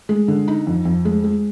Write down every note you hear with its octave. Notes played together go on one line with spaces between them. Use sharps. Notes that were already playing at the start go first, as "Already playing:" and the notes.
G#3
D3
D#4
F2
F2
G#3
G#3